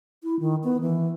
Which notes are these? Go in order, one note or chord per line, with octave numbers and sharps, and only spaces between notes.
E4
D#3
B3
E3